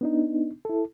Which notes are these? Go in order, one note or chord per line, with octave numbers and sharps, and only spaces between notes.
B3 D4 D#4
E4 A4